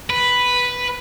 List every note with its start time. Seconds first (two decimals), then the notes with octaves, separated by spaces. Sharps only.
0.10 B4